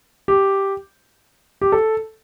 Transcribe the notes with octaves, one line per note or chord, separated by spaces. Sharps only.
G4
G4
A4